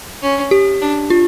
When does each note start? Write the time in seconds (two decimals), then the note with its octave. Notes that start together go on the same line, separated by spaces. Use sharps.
0.22 C#4
0.51 G4
0.81 D4
1.10 F4